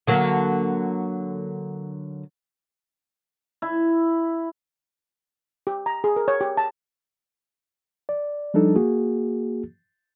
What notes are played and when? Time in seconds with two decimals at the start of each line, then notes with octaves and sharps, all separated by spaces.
0.07 D3 F#3 A#3
3.62 E4
5.67 G4
5.86 A#5
6.04 G#4
6.16 A#4
6.28 C#5
6.41 G4
6.57 A5
8.09 D5
8.54 F3 G3 D4 D#4 A4
8.76 A#3 F#4 G#4